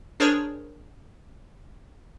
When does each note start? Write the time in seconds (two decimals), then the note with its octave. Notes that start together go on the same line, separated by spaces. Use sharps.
0.20 D4 G#4 A#4 C5 C#5